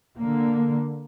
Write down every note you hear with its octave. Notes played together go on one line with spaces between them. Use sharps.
D3 A#3